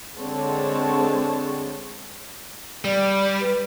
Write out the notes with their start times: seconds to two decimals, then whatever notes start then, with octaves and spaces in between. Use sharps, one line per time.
0.17 D3 G#3 C4 C#5 A5
2.85 G3 D5
3.41 B4